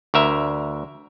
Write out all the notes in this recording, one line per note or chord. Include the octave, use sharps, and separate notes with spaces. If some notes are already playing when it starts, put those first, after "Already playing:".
D2 A#4 E5